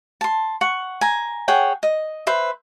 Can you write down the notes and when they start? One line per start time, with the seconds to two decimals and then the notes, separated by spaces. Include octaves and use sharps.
0.21 A5 C6
0.61 F#5 C#6
1.01 G#5 A#5
1.48 G#4 C#5 F#5 G5
1.83 D#5
2.27 B4 C5 E5